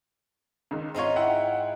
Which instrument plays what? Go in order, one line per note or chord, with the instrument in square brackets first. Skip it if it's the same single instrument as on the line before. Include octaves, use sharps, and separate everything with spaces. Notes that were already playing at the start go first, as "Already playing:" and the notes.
[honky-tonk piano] C#2 D#3
[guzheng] G#2 D#4 F4 [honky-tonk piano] C4 C#5
[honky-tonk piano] E4 F#5 G5